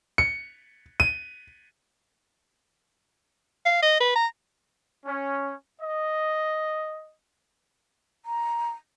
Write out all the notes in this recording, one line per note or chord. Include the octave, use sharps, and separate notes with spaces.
C#7
D#7
F5
D#5
B4
A#5
C#4
D#5
A#5